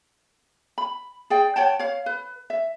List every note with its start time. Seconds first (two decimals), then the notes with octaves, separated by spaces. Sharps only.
0.78 B5
1.30 G#4 D5 G5
1.56 C#5 F#5 G5 A5
1.79 C#5 F5
2.06 B4
2.50 E5